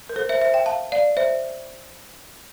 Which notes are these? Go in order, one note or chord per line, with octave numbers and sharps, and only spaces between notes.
A#4
A4 C5
C5 E5
C5 E5
E5 G5
F5 A5
D5 F5
C5 E5